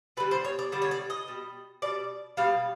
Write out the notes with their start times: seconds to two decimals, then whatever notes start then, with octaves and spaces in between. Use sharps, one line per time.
0.17 D3 B4
0.20 G3
0.31 C5
0.44 C#5
0.59 D5
0.72 D3 G3 D5
0.82 C#5
0.91 D5
1.10 D#5
1.27 B2 G3
1.82 B2 G3 D5
2.37 B2 G3 F5